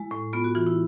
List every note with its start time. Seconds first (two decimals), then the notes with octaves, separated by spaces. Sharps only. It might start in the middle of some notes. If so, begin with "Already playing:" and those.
Already playing: G#3 E4
0.11 A2
0.33 B3 F4
0.44 F#4
0.55 E3 F4
0.67 E4